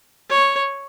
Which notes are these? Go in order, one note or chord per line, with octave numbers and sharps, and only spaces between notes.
C#5